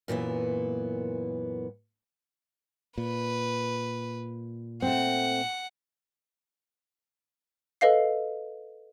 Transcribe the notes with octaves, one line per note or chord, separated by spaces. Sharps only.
F#2 A#2 E3 B3
A#2 B4
A3 C4 F#5
A4 B4 D#5 F5 C7